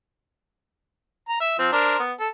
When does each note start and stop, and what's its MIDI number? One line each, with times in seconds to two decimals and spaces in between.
1.29 1.39 82
1.40 1.54 76
1.59 1.69 53
1.59 1.69 60
1.72 1.99 62
1.72 1.99 70
1.72 1.99 72
1.99 2.13 59
2.20 2.28 69